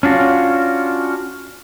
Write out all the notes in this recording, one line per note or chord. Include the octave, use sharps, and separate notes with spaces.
C#4 D4 F4 F#4